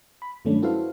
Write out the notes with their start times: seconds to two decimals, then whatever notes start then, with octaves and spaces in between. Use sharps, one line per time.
0.22 B5
0.45 G2 D#3 F#3 A3 C#4 D4
0.62 E4 F#4 A4 B4 C5 F5